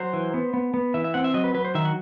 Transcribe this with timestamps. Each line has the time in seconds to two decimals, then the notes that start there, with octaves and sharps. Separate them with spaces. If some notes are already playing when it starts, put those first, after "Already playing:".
Already playing: F#3 C5
0.13 E3
0.34 B3
0.54 B3
0.74 B3
0.94 E3 E5
1.04 E5
1.14 C4 F#5
1.24 E5
1.34 F#3 D#5
1.44 B4
1.54 F#3 B4
1.65 C5
1.75 D#3 E5
1.85 F#4